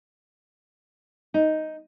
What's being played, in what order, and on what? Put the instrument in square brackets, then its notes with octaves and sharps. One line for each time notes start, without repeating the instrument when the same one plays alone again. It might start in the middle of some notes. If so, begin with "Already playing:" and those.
[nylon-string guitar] D#4